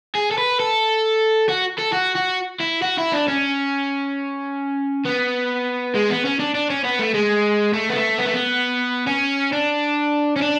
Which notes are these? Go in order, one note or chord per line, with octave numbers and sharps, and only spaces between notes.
G#4
A4
B4
A4
F#4
A4
F#4
F#4
E4
F#4
E4
D4
C#4
B3
G#3
B3
C#4
D4
D4
C#4
B3
A3
G#3
A3
B3
A3
B3
A3
B3
C#4
D4
C#4
D4